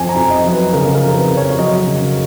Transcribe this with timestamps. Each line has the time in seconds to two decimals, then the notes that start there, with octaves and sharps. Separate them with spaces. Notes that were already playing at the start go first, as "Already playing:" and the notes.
Already playing: F2 G#5
0.09 A#5
0.16 F2
0.30 D#5
0.44 F#3
0.52 B4
0.73 C#3 A#4
0.95 A#4
1.01 F2
1.16 B4
1.30 F2
1.37 C#5
1.59 F#3 D#5
1.87 C#3